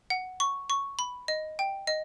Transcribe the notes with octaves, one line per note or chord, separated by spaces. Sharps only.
F#5
C#6
C#6
B5
D#5
G5
D#5